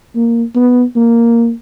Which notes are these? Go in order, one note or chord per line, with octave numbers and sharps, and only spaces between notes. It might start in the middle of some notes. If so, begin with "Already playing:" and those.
A#3
B3
A#3